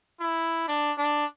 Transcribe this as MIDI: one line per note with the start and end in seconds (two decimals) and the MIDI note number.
0.20 0.63 64
0.68 0.92 62
0.98 1.25 62